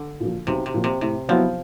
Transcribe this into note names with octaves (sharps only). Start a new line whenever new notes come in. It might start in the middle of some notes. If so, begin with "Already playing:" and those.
Already playing: D3
A#2 F3
B1 C3
C3
A#2 F3
C3
A2 C3
F3 F#3 B3 E4